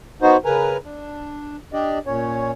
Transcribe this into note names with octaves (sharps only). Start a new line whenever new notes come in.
B3 D#4 F#4 C5
C#3 A#4 B4 G#5 A#5
D4
D4 G4 D5 D#5
A#2 C#4 C#5